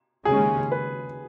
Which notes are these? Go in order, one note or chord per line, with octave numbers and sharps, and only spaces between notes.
D#2 C#3 G#3 C#4 G#4
B4